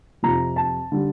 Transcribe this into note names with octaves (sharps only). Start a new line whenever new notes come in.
F2 C3 F3 A#5
A5
D3 G3